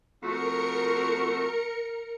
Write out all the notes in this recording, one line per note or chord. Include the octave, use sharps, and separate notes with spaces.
F2 A3 F#4 A#4 C#7